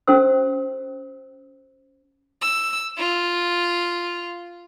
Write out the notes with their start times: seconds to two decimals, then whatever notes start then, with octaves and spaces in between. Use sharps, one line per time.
0.07 C#4 F#4 A4 C5 E6
2.42 E6
2.97 F4